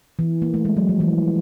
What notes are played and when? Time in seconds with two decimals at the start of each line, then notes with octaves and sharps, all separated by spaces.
0.19 E3
0.42 A#3
0.54 A3
0.65 G#3
0.77 F#3
0.89 F3
1.00 E3